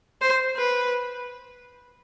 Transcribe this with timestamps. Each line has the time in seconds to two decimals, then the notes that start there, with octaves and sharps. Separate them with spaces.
0.21 C5
0.56 B4